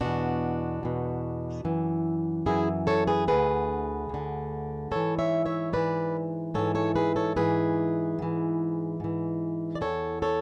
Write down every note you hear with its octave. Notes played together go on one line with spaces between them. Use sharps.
E2 B2 D4 F#4
E2 B2
F#2 E3
F#2 E3 E4 G#4
A4 C#5
G#4 B4
D2 D3 G#4 B4
D2 D3
G#2 E3 A4 C#5
C#5 E5
C#5 E5
G#2 E3 B4 D5
G#2 E3 A4 C#5
A4 C#5
G#4 B4
A4 C#5
G#2 E3 G#4 B4
G#2 E3
G#2 E3
D5
E2 B2 A4 C#5
A4 C#5